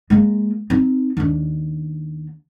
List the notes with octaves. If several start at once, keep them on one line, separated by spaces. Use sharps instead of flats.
G#3 A#3
C4 D#4
D#2 D4